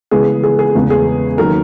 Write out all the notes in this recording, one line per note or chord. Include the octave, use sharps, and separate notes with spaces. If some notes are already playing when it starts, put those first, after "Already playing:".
C#3 E3 G#3 B3 G#4
G#4
G#4
E2 C#3 G#3 B3
G#4
D#3 F#3 A#3 A#4